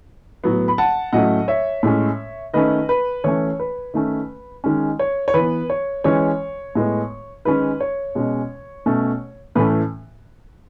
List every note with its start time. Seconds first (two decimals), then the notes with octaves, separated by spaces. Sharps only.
0.44 A2 F#3 B3
0.68 B5
0.78 F#5 A5
1.13 A2 F#3 A3 C#4 D#5 F#5
1.48 C#5 E5
1.83 A2 G#3 C#4
2.54 D#3 A3 C#4 B4 D#5
2.89 B4
3.24 E3 A3 C#4 C#5
3.59 B4
3.94 D#3 A3 C#4
4.64 D#3 G#3 C#4
4.99 C#5
5.28 C#5
5.34 E3 B4
5.39 B3
5.70 C#5
6.04 E3 G#3 C#4 C#5
6.75 A2 G#3 B3
7.45 D#3 G#3 C#4 B4
7.80 C#5
8.15 B2 G#3 C#4
8.86 B2 A3 C#4
9.55 A2 E3 A3 C#4 B4